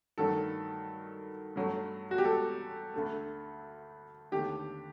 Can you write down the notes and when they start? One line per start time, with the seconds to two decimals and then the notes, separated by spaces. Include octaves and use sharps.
0.18 G2 D#3 F#3 A3 A4
1.56 G2 F#3 A3
2.11 F#4
2.18 G4
2.24 A4
2.94 D2 D3 A3
4.32 D#2 D3 A3 G4